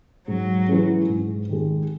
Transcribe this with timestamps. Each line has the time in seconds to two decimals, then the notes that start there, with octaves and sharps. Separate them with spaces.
0.28 G#2 F#3
0.68 E3 G#3 C#4
1.09 G#2
1.49 D#3 G#3